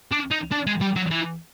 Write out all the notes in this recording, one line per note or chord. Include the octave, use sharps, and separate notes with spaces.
D4
D#4
D4
G#3
G3
F#3
E3